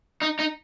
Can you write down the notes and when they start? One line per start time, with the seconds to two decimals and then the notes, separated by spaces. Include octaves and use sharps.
0.22 D#4
0.39 D#4